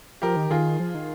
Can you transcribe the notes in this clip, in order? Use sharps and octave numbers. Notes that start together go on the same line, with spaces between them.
F3 G4 A#4
D#3
D#3 F4 G#4
F3
D#3